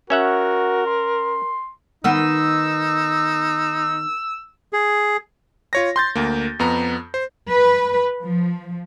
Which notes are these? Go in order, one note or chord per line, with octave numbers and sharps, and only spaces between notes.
C#4 F#4 A#4 E5 F#5
C6
D#3 B3 D#4 E6
G#4
F4 C#5 A#6
C6 G6 A6
D2 A#3
F2 B3 A#5
C5
B4
F3